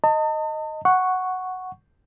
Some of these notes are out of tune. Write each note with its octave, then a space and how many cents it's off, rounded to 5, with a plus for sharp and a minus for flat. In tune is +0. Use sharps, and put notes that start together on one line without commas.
D#5 +0 A5 +40
F#5 +0 C#6 +0